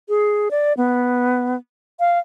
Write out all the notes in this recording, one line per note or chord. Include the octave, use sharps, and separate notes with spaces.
G#4
D5
B3
F5